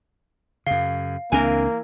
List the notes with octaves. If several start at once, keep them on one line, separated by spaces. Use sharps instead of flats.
F#2 C#3 F5 C7
C#2 E3 A#3 C4 D4 A#4 G#5